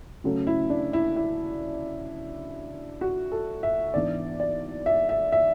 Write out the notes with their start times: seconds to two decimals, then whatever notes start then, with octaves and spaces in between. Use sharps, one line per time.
0.24 C#3 F#3 A3 C#4
0.47 E4
0.70 D4
0.93 E4
1.16 E4
3.01 F#4
3.32 A4
3.63 E5
3.94 G#2 E3 B3 D4 D5
4.40 D5
4.86 E5
5.09 E5
5.32 E5